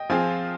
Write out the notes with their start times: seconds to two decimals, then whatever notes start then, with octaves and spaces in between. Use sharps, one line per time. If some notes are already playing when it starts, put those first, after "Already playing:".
Already playing: D#5 G5
0.10 F3 C4 F4 G#4 F5 G#5